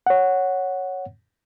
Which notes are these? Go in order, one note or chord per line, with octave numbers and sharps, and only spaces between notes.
C#5 F#5